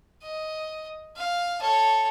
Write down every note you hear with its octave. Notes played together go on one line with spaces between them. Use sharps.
D#5
F5
A4 C#5